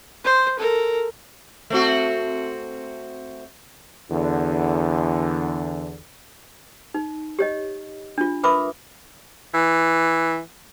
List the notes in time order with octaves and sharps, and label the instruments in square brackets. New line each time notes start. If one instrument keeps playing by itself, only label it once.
[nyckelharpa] C5
A4 A#4
[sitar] A3 C4 F#4
[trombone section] E2 D3
[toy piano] D#4
G4 C#5 D#5
D4 F4
A#4 B4 E5 B5 D6 D#6
[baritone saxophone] E3